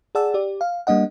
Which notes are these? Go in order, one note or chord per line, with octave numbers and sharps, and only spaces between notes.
G#4 D5 F#5 A5 E6
G4 D5
F5
G3 A#3 D4 D#5 F#5